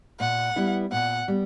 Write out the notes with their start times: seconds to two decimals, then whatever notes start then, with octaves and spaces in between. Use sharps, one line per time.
0.20 A#2 F#5
0.56 G3 B3 E4
0.92 A#2 F#5
1.28 G3 B3